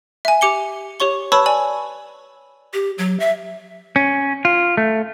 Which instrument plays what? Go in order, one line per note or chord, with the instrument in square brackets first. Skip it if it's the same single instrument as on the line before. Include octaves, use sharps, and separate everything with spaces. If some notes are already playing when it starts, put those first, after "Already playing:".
[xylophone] E5 G#5
G4 D6 C#7 G7
G4 C#5 C#6 G7
B4 C#5 A5 B5 C#6 E6
D5 G#5 F#7
[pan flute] G4
F#3
E5
[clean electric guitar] C#4
F4
A3